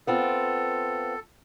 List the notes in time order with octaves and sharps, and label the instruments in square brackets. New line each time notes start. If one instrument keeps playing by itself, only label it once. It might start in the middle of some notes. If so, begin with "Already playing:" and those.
[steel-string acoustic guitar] B3 C4 F4 [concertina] A4